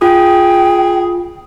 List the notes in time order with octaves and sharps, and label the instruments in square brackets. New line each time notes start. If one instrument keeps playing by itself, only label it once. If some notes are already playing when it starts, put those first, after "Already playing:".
[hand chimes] F4 [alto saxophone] G#4 [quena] G5